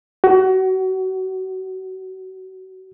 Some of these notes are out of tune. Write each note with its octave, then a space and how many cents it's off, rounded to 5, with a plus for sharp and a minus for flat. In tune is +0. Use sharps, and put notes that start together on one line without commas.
F#4 +30